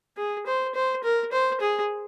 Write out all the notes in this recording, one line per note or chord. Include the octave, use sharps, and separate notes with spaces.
G#4
C5
C5
A#4
C5
G#4